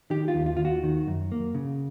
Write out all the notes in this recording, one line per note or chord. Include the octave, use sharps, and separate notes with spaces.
D#3 G4
F4
D#2
F4
D#2 F4
F#4
D#3
F#2
A#3
C#3